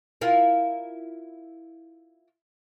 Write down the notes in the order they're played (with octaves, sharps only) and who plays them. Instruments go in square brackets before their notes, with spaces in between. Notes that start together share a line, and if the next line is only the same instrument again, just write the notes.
[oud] E4 F4 A#4